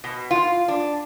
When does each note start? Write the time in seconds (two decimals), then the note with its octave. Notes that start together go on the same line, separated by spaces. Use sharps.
0.04 B2
0.31 F4
0.68 D4